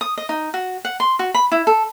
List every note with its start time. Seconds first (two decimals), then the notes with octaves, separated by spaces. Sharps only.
0.01 D#6
0.17 D#5
0.29 D#4
0.54 F#4
0.85 F#5
1.00 C6
1.19 F#4
1.34 B5
1.52 E4
1.67 A4